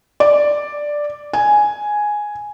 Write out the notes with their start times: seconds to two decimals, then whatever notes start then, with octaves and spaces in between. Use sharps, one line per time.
0.20 D5
1.33 G#5